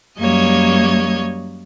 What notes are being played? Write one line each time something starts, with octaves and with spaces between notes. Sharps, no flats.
F#2 G3 A#3 C#5 D#5 G#6